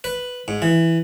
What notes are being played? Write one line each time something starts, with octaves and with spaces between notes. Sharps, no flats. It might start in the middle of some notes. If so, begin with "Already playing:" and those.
B4
G#2
E3